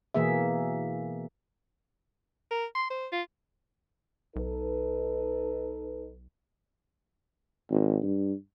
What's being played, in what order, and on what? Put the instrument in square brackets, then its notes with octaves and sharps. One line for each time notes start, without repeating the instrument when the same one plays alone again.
[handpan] B2 E3 A#3 G#4 E5
[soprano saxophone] A#4
C6
C5
F4
[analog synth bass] B1 [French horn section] D#4 A4 B4
[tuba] G#1
G2